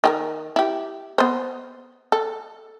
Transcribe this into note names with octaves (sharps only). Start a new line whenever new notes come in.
D#3 G4 A#4
E4 G4
B3 C5
A4